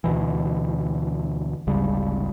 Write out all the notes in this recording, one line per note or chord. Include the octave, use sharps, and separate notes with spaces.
D2 B2 E3
G#1 D2 C#3 G3